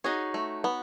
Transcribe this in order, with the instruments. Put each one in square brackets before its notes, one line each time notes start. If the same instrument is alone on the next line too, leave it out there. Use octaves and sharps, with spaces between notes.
[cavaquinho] D#4 F#4 C#5 [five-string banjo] G#4
[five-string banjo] A3
B3